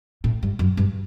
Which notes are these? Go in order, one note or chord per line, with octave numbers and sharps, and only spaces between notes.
A2
G2
F#2
G2